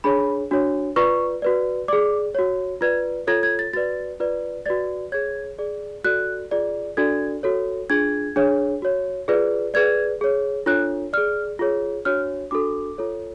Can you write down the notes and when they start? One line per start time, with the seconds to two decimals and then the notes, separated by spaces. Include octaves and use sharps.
0.04 D4 G#4 C#5 B5
0.51 D4 F#4 C#5
0.96 F4 B4 D5 C#6
1.42 F#4 B4 D5
1.88 G#4 D5 D6
2.35 F#4 C#5
2.81 F4 B4 D5 G#6
3.27 F4 A4 C#5 G#6
3.43 G#6
3.59 A6
3.73 F#4 B4 D5 A6
4.20 F4 B4 D5
4.66 F#4 B4 D5 A6
5.12 G#4 C#5 G#6
5.58 G#4 D5
6.04 F#4 A4 D5 F#6
6.51 F4 G#4 D5
6.97 D4 F#4 A4 D5 G#6
7.43 F#4 A4 C#5
7.90 D4 F4 G#4 G#6
8.36 D4 G#4 C#5
8.82 F#4 C#5
9.28 F4 G#4 B4 D5
9.74 G#4 B4 D5 G#6
10.21 G#4 C#5
10.66 D4 F4 A4 C#5 F#6
11.13 G#4 D5 F6
11.59 F4 G#4 C#5
12.05 D4 F#4 C#5 F6
12.51 D4 F#4 A4 D6
12.98 F4 A4 C#5